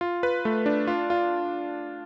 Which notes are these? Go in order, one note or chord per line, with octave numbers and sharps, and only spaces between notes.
F4
B4
A3
D4
F4
F4